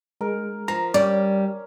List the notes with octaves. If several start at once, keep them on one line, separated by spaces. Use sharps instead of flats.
G#3 A#4
F3 A#5
G3 C#4 D5